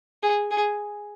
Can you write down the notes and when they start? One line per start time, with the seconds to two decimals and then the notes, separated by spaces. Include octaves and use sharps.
0.23 G#4
0.51 G#4